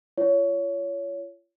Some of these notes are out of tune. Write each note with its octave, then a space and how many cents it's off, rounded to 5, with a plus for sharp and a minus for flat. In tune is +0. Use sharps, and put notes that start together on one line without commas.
F4 -35 C#5 +20